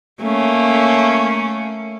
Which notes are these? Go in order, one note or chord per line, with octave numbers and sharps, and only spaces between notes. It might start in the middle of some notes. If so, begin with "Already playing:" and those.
A3 A#3 C#4